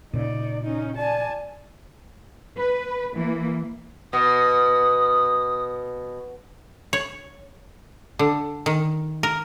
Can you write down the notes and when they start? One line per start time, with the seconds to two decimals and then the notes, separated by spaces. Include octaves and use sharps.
0.13 A#2 C#3 D#4 D5
0.63 C#4 D#4
0.97 D5 G#5 A5
2.57 B4
3.16 E3 A#3
4.13 B2 D#6
6.93 C#5
8.19 D3
8.66 D#3
9.23 A#4